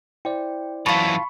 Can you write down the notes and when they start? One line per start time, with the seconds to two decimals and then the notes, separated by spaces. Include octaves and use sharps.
0.25 E4 C5 D5 G5
0.86 F#2 E3 F4 A5 B5 C#6